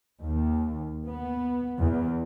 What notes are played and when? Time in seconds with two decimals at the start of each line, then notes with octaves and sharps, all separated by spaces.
0.23 D#2
1.07 B3
1.80 E2